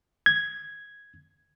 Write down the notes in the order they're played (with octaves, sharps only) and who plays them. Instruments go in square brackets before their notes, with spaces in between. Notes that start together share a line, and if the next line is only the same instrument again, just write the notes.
[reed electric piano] G#6